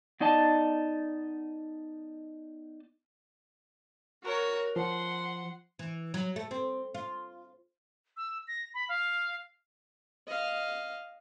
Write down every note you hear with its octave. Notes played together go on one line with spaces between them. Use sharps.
B3 D#4 D5 D#5 A5
F#4 A#4 C#5
F3 F#5 C6
E3
F#3
A3
C4
F4
E6
A#6
B5
F5
D#5 F5